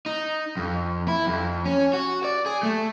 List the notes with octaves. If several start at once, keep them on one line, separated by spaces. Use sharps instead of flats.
D#4
F2
E4
F2
C#4
F#4
D5
G#4
A3